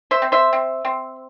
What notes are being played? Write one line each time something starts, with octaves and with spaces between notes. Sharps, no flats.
C5 E5
C4
C5 E5
C4
C4